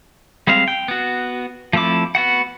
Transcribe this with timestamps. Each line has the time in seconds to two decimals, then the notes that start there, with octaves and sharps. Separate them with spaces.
0.47 G3 G#3 C4 F5
0.68 G5
0.88 B3 F#4
1.73 F3 A3 C4 E4 D6
2.15 B3 F#4 F#5